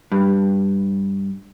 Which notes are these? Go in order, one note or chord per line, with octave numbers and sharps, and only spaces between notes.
G2